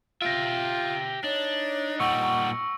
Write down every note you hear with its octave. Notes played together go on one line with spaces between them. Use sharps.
F4 G4 E5 A#6 D7
D4 D#4 C#5
A#2 G3 F#5 C#6 E6 C#7